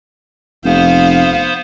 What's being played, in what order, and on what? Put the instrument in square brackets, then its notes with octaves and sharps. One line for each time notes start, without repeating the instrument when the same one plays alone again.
[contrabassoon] F1 [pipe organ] B3 C5 [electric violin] F5